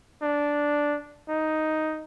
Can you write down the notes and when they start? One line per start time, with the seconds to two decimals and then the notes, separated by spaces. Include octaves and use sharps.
0.22 D4
1.28 D#4